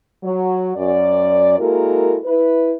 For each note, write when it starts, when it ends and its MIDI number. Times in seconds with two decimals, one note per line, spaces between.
0.23 0.71 54
0.77 1.58 42
0.77 1.58 74
1.59 2.17 56
1.59 2.17 58
1.59 2.17 64
1.59 2.17 66
1.59 2.17 69
1.59 2.17 70
2.25 2.73 64
2.25 2.73 71